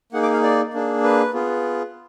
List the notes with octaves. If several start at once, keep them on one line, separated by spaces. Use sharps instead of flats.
A#3 D#4 G#4 F#5
D6
F5
D5
A#3 D4 G#4
B4
B3 F4 G#4